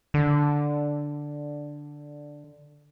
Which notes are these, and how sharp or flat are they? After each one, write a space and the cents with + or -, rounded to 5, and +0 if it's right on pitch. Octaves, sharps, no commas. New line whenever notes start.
D3 +0